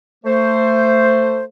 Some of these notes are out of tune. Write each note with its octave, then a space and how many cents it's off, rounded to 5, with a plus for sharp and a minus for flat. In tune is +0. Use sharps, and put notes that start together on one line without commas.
A3 +20 C5 +0